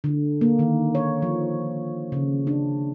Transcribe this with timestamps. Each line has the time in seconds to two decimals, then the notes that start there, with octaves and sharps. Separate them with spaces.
0.04 D3
0.41 A#3
0.59 D#3
0.95 C#5
1.22 F3
2.12 C#3
2.47 D4